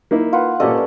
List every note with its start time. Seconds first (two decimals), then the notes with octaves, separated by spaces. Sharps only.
0.11 A#3 D#4 E4
0.32 F4 B4 F#5
0.60 A#2 C#4 G4 A4 D5 D#5